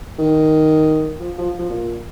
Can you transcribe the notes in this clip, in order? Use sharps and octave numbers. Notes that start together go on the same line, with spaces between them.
D#3
F3
F3
F3
A#2